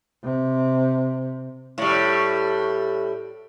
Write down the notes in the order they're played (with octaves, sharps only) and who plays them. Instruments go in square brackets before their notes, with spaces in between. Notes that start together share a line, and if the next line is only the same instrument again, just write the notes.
[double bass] C3
[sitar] A2 G3